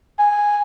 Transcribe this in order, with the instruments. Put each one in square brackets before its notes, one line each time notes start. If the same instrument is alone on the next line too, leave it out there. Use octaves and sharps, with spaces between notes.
[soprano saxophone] G#5